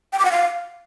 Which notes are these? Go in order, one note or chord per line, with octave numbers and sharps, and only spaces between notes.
G5
D6
F#5
F5